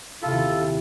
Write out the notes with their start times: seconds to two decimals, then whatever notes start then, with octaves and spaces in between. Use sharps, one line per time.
0.22 D#1 C3 E4 F4 A4